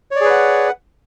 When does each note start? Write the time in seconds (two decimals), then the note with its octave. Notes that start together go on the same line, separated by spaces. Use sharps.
0.11 C#5
0.16 D5
0.21 G#4
0.25 B4
0.30 F#5